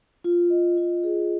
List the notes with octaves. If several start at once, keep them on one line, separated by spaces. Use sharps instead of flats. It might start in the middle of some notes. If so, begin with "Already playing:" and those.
F4
D#5
F4
G#4